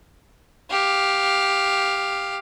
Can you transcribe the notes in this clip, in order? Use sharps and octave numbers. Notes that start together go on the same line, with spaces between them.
G4 F5